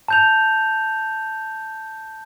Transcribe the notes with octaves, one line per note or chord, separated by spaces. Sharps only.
A5 G6 F7